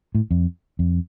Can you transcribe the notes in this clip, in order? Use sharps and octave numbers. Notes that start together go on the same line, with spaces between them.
A2
F2
F2